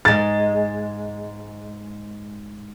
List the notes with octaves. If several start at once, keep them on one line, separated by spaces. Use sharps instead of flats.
G#2 G#3 A6